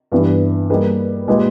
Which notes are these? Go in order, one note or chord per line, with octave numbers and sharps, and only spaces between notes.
G2 E3 G3 B3 G4
G3 A#3 D#4 G#4 B4
A#2 G#3 D#4 G4 B4